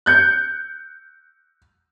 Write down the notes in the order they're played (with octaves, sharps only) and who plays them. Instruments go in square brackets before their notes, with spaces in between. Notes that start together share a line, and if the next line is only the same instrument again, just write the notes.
[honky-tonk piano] F#6 G6 C#7